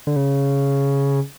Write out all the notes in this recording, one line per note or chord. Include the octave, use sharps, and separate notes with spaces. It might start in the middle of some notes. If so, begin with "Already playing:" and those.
D3
C#3